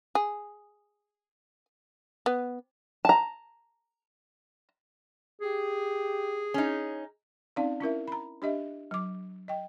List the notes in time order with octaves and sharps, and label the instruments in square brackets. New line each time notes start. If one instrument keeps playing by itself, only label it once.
[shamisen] G#4
B3
[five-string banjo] A5 A#5
[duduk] G4 [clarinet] G#4
[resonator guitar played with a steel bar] C#4 D#4
[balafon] C4 C#4 D#4 D5 F5
C#4 E4 A#4 E5
A#5 B5
D4 G4 D#5 E5
F#3 D6
D#5 G5